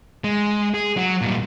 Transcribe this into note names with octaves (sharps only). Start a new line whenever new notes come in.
G#3
G#4
F#3
A#2 G3